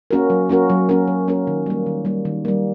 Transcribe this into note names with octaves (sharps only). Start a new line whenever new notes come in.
A#3 C#4 F#4 A#4
F#3
A#3 C#4 F#4 A#4
F#3
A#3 C#4 F#4 A#4
F#3
A#3 C#4 F#4 A#4
D#3
G3 A#3
D#3
G3 A#3
D#3
G3 A#3